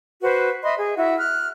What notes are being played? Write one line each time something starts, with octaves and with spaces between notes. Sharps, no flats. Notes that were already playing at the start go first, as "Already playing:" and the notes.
F#4 B4 C5
D#5 E5 B5 C6
G#4
E4 F#4
F6 F#6